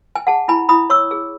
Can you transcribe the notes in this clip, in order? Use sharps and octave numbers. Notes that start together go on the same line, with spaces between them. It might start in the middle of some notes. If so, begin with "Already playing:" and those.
G#5
G#4 F#5 A5
E4 G#5 B5
E4 B5 D#6
C#5 C#6 E6
G#4